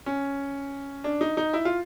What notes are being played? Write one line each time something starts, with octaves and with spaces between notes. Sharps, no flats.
C#4
D4
D#4
D#4
E4
F4